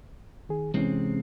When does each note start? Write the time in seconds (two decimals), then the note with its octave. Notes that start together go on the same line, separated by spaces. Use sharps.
0.49 D#3 G#4
0.74 C3 E3 G#3 C4 C#4